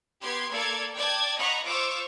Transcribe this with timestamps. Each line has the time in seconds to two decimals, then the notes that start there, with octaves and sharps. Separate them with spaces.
0.23 B3 G4 C6 G#6
0.53 A#3 A4 D5 G#6
0.95 D5 G5 A5 G#6
1.37 D#5 F#5 A#5 B5 C#6
1.66 F4 C5 C#6 D6 E6